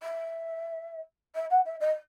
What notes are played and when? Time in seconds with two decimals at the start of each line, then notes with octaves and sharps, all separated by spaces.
0.03 E5
1.35 E5
1.50 F#5
1.65 E5
1.80 D#5